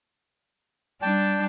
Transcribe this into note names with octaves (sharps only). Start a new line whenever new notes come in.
G3 D4 G5 A5